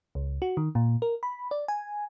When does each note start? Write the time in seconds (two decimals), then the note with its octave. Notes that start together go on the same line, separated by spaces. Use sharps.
0.15 C#2
0.42 F#4
0.57 D#3
0.75 A#2
1.02 A#4
1.23 B5
1.51 D5
1.68 G#5